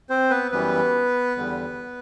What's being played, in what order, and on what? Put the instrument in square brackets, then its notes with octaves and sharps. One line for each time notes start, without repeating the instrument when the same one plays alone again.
[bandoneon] C4 C5
B3 B4
F#2 E3 G3 B3 B4
E2 D3 G3